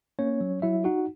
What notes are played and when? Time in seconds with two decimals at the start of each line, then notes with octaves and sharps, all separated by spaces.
0.19 A#3 C#4 C#5
0.41 F#3
0.62 F#3 E4 E5
0.84 D#4 F#4 F#5